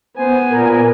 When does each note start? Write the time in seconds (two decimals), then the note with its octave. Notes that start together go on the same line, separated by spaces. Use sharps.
0.18 B3 C5 G#5
0.50 A#2 A#4